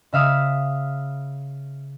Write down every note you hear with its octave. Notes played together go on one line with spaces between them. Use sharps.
C#3 E5 F5 D#6